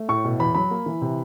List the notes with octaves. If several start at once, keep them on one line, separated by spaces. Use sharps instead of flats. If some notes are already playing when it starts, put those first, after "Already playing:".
Already playing: A3
A2 C#6
B2
E2 B5
F#3 B5
A#3
E3
C3